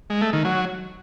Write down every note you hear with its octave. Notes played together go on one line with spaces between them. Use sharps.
G#3
A3
D#3
F#3